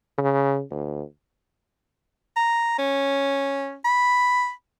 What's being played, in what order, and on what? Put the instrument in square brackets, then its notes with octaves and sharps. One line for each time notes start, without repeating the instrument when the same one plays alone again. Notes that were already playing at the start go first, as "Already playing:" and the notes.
[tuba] C#3
D2
[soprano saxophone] A#5
C#4
B5